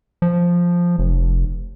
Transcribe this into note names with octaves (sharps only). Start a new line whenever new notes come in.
F3
F1